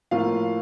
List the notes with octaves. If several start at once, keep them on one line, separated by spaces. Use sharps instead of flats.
A2 F3 A#3 F4 F5